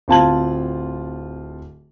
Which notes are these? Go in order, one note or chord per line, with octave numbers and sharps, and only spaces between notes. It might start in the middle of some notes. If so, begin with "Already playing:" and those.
D1 C4 F4 A5 G#6 F#7